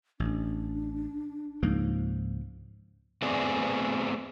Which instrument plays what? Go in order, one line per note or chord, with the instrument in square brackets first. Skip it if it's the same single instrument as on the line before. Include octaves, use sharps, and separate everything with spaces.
[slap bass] A1 [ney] D4
[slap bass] C#2 F3 A#3 [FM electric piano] G#2
[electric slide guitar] A3 B3 C4 G#4 B4 D5